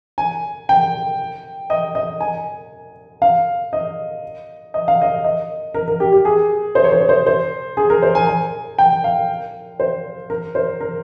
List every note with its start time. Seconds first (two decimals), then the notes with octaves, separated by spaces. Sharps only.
0.18 G#5
0.69 G5
1.70 D#5
1.95 D#5
2.21 G#5
3.22 F5
3.73 D#5
4.74 D#5
4.88 F5
5.01 D#5
5.24 D#5
5.74 A#4
5.88 A#4
6.00 G4
6.13 G4
6.25 G#4
6.75 C5
6.84 C#5
6.92 C5
7.00 C#5
7.09 C5
7.26 C5
7.77 G#4
7.90 A#4
8.02 C5
8.15 G#5
8.27 G#5
8.78 G5
9.04 F5
9.80 C5
10.30 A#4
10.55 C5
10.80 A#4